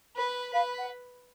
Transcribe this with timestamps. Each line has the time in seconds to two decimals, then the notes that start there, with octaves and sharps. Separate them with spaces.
0.16 B4
0.53 B4 F5
0.78 F#5